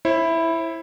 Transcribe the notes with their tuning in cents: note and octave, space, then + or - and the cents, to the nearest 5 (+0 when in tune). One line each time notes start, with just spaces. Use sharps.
E4 +0 C5 +45